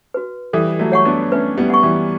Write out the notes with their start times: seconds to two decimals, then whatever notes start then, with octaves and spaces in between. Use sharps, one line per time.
0.14 F#4 B4
0.53 E3 G3 A4
0.79 F#3 A3
0.92 C#5 F#5 C#6
1.05 B3 D4
1.31 A3 C#4 B4
1.58 G3 B3
1.70 F#5 C#6
1.83 E3 G3